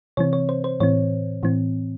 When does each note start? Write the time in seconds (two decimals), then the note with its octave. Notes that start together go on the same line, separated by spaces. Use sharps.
0.17 C3 E3 C4 C#5
0.33 C#5
0.49 C5
0.64 C5
0.80 A2 E3 C4 C#5
1.43 A2 E3 C4